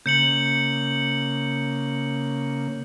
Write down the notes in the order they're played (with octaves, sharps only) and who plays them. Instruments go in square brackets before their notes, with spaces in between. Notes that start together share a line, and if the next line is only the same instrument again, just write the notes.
[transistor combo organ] C#3 A#3 [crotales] G6 C#7 F#7